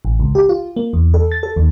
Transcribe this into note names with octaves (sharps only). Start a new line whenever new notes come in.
A1
C#2
G4
F4
A#3
E2
A4
A6
A4
D#2